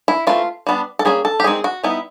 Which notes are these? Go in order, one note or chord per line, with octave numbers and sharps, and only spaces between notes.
E4
E3 A3 C4 F4
G3 B3 D4
A4
G3 A#3 C#4 G#4
A4
G4
D#3 G#3 C4 D#4 G#4
F#4
G3 B3 D#4 E4